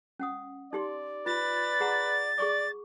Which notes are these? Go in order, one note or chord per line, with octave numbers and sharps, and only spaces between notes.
C#4 F#5 D#6
D#4 G4 D5 C6
F4 B4 A6
G#4 F#5 A#5
G#4 D5 C#6 D6